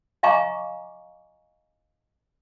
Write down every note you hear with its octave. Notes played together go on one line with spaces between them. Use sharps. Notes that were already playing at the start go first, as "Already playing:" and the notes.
D#5 F5 G#5 A#5 C#6 D6